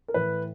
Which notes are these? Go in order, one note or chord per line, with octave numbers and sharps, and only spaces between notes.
A#4
A2 E3 B4